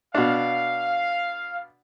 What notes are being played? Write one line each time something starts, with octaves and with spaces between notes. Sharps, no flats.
B2 D4 F5